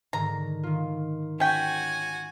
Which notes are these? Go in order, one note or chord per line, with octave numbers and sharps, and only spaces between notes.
G#2 D3 D#3 A#5
D#3 F4
C#4 F#4 G5 G#5 G#6 B6